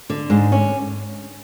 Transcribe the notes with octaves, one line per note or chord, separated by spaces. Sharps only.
D3
G#2
C#4